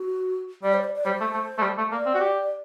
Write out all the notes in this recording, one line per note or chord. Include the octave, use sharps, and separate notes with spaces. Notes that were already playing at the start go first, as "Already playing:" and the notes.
Already playing: F#4
G3 D5
C5
D5
D5
G3 C5
A3
A3
A3
G3
A3
A#3 D5
C4
F#4
G4